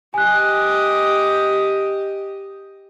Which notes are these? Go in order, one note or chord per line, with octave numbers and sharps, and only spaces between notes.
G4 D#5 G#5 F#6